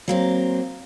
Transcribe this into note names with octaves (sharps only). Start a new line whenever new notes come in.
F#3 A#3 C4